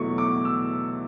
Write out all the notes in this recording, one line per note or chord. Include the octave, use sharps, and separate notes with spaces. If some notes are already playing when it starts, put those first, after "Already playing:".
Already playing: E2 B2 F#3 A3 C#6
D6
E6